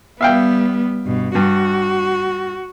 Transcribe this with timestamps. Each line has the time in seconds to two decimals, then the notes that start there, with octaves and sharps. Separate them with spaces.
0.21 G3 B3 E5 F5 G5
1.06 G2 B2
1.35 G2 F#4